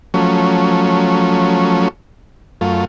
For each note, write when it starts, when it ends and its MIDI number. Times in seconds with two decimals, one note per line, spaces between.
0.14 1.88 53
0.14 1.88 54
0.14 1.88 57
0.14 1.88 61
2.61 2.85 42
2.61 2.85 57
2.61 2.85 65